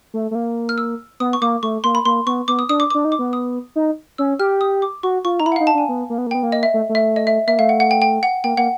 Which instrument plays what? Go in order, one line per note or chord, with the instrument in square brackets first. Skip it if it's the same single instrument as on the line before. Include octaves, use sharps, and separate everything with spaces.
[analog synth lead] A3
A3
A#3
[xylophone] F6
E6
[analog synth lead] B3 [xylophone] D#6
[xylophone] C#6
[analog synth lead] A#3 [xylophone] D6
[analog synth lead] A3 [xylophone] C#6
[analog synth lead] A#3 [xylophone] C6
[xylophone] B5
[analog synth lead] A#3 [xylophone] C6
[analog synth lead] B3 [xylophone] C#6
[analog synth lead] B3 [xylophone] D6
[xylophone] D#6
[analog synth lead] D4 [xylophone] D#6
[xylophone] D6
[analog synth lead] D4 [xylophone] D6
[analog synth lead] D#4
[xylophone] D6
[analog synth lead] B3
[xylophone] D#6
[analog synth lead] D#4
[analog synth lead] C#4 [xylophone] E6
[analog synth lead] G4 [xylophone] F6
[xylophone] D#6
D6
[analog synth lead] F#4 [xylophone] C#6
[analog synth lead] F4 [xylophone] C#6
[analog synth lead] D#4 [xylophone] A#5
[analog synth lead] E4 [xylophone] B5
[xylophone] F#5
[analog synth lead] D#4 [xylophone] F5
[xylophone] A5
[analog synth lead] D4 [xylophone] G#5
[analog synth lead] B3
A#3
B3
A#3
[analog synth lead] B3 [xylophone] G5
[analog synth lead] A#3
[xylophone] D#5
E5
[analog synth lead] A3
A3
[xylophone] E5
D#5
E5
[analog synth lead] A#3 [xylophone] E5
[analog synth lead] A3 [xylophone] F5
[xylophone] F#5
F#5
G5
G5
F#5
[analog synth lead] A#3 [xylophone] G5
[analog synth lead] A#3 [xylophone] F#5